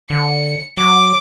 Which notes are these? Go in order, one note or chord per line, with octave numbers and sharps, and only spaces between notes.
D3 C#7
F#3 D6